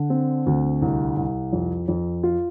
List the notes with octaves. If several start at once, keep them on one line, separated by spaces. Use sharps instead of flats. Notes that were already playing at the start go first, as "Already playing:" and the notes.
Already playing: D3
C4
D2
C2
C2
F2
F2
F4